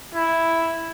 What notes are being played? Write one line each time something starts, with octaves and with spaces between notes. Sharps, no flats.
E4